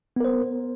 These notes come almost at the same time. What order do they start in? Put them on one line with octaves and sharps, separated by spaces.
B3 A#4 C5